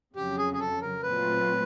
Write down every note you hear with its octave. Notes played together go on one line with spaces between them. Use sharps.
F2 C#3 F#3 G4
G#4
G#4
A4
A#4
A#2 F#3 A3 C4 F4 B4